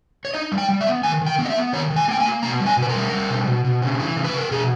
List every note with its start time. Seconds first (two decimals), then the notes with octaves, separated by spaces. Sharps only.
0.25 C#5
0.34 D#4 D#5
0.52 G3
0.58 G5
0.69 G3
0.81 E5
0.86 B3
1.03 D#3 G#5
1.21 D#3
1.26 G5
1.38 B3
1.45 D#5
1.50 E5
1.56 B3
1.73 D#3 C#5
1.90 D#3
1.96 G#5
2.08 A#3 G5
2.20 G#5
2.26 A#3
2.43 B2 A#5
2.60 G3
2.66 G#5
2.77 B2
2.82 B4
2.89 A#4
2.95 G3
3.12 G3
3.30 B2
3.47 B2
3.65 B2
3.82 C#3
3.99 E3
4.17 C#3
4.24 B4
4.34 C#3 A#4
4.51 B2 G#4